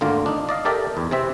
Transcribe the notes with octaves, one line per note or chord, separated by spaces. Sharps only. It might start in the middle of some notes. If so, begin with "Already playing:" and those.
G#1 D2 D3 A#3 F4 A#4
D4 D#4
D5 D#5 F5
G4 A4 A#4 D5 E5 G5
E2
C3 E3 C4 E5